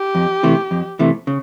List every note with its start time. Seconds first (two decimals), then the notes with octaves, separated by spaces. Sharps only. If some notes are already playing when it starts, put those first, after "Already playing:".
Already playing: G4
0.15 F2
0.43 C3 E3 A3
0.71 F2
0.99 C3 E3 A3
1.27 C#3